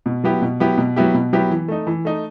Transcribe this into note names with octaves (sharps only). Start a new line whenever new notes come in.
B2
F#3 B3 E4 G4
B2
F#3 B3 E4 G4
B2
F#3 B3 E4 G4
B2
F#3 B3 E4 G4
E3
A3 D#4
E3
A3 D#4